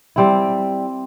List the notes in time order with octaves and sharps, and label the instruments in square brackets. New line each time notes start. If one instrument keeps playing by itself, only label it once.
[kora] G3 C4 E4